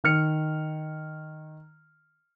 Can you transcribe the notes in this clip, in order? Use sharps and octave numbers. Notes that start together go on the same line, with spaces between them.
D#3 F6 C#7